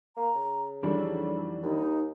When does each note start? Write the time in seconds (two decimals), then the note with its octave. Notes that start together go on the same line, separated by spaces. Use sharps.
0.17 A#3 A#5
0.35 C#3
0.83 F2 D#3 E3 F#3 G3 D4 A4
1.62 D#2 D#4